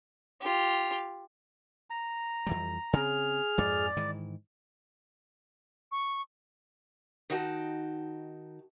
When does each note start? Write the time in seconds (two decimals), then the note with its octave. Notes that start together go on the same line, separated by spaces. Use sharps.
0.41 F4 G4
1.90 A#5
2.47 F2 E3 G3
2.93 C#3 C4 G#4 F6
3.58 F2 G#2 D5
3.97 G#2 D#3 E3
5.92 C#6
7.30 D#3 D#4 F#4 G5 A5